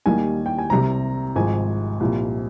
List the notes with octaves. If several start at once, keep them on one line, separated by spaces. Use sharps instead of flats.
D#2 D#3 G3 A#3 G#5
G5
G#5
C2 C3 G3 A#5
G#1 G#2 F3 G#5
C2 A#2 F3